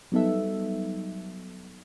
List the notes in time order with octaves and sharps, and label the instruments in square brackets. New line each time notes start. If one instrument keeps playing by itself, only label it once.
[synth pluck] F#3 G3 B3 D#4 A4 E5